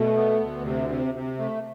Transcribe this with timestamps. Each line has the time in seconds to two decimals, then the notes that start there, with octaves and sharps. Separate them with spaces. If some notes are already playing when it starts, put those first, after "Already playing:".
Already playing: B2 A3
0.16 B3
0.40 D2
0.65 C3
0.89 C3
1.14 C3
1.39 A3